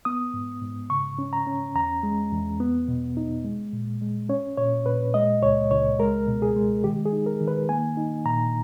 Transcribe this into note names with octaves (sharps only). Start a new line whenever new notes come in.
B3 D#6
G#2
G#2
C#3 C#6
C#4
A#5
C#4
E2 A#5
G#3
E2
B3
B2
D#4
G#3
A#2
G#3
C#4 C#5
A#2 C#5
A#2 B4
G#3 D#5
C#2 C#5
C#2 C#5
G#3 A#4
B2
G#4
G#3
D#3 G4
G#4
D#4
A#4
D#3
B4
A#3 G#5
D#4
A#2 A#5